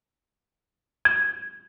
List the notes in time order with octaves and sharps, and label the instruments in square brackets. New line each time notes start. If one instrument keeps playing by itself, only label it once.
[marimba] G#6